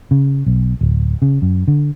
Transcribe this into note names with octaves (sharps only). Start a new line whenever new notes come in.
C#3
B1
D1
C#3
F#2
D3